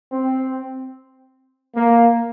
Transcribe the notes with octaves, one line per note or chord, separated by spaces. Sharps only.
C4
A#3